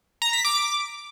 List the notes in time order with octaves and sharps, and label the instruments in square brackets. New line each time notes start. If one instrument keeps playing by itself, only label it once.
[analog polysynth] A#5
B6
D6